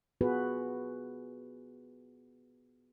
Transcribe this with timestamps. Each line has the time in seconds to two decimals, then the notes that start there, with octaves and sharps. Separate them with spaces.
0.21 B3 F4 F#4 G#4 B4